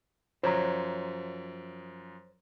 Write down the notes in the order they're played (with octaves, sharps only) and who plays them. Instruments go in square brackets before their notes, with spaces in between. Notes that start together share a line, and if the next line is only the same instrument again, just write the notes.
[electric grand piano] F#2 F3 [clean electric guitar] C5 C#5 A#5